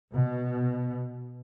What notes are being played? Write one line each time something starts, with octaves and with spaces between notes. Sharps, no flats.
B2